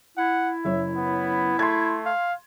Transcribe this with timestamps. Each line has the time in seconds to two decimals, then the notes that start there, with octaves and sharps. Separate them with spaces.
0.17 E4 F#5
0.65 F#1 F#2 C#5 E5
0.96 B3
1.59 A3 C6 G#6
2.06 F5